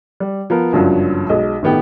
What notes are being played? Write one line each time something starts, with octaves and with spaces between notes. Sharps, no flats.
G3
F3 B3 A#4
F#1 G2 F3 F#3
B1 G#3 D#5
G1 A2 D#3 B3 G4 G5